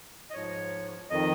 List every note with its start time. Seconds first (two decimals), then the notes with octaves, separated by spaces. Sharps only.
0.30 D#5
0.34 G#2 F3 C#5
1.10 F2 D#3 D#5